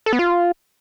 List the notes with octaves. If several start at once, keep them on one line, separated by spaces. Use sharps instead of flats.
A4
B3
F4